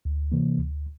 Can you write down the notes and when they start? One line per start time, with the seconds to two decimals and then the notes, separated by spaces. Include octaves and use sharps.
0.05 D2
0.32 C3 E3 A#3
0.58 D2